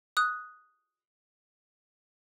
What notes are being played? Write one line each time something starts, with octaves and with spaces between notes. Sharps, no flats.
D#6 F#6